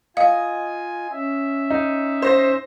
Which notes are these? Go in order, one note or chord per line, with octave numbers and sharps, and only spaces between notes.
F4 D#5 F5 G#5
C#4 E5
D#4
C5 A#6